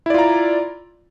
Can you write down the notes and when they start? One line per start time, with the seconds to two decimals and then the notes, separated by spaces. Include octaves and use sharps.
0.06 E4
0.10 D5
0.14 F4
0.18 A#5